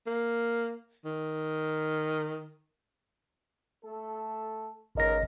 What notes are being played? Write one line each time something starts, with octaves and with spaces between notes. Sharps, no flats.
A#3
D#3
A3 A4
G#1 C#2 D#4 A#4 D#5 A#6